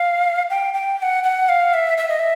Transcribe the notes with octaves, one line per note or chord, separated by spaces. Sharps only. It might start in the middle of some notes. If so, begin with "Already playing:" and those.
Already playing: F5
G5
G5
G5
F#5
F#5
F5
E5
E5
D#5
E5